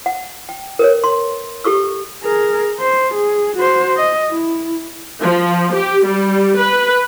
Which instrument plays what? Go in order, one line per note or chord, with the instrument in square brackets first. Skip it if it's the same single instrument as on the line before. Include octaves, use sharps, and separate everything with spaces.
[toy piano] F#5
G5
A#4 B4 C#5
C6
G4 A4 C#6 E6
[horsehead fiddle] G#4 A#4
C5
G#4
F#4 C5
D#5
E4
[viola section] F3
G4
G3
B4